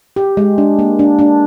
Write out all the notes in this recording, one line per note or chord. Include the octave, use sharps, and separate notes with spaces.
G4
G#3
D4
A#3
D4
D4